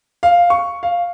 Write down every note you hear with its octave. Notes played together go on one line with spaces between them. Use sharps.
F5
C#6
F5